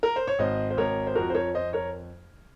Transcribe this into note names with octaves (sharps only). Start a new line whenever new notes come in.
A#4
C5
C#5
G#1 C5 D#5
C5
G#1 A#4 C#5
C5
F2 F#4 A#4
C5
A#4 C#5
F2 C5 D#5
A#4 C#5